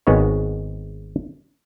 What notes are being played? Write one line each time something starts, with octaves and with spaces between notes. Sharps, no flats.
G#1 G#3 B3 D#4 C#5